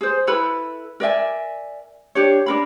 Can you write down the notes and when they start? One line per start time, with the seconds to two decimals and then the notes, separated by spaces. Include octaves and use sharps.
0.01 G#4 C5
0.27 E4 A4 B4 B5
1.00 A#4 D5 E5 G#5
2.15 D4 G4 C#5
2.46 D4 A#4 B5